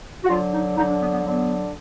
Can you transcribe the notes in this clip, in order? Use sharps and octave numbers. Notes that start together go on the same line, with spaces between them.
F#4
D3 F#3 F4
D#4
D3 F#3 D#4
D4
B3
B3
D3 F#3 B3